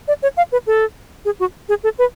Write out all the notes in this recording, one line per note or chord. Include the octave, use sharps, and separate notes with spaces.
D5
C#5
F5
B4
A4
G#4
F#4
G#4
A4
B4